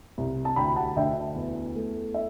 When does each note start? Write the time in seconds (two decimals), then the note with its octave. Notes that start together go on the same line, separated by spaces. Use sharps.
0.18 C2
0.45 A5
0.56 D2 G5 B5
0.76 F#5 A5
0.96 D2 E5 G5
1.35 E2
1.76 A3
2.14 E5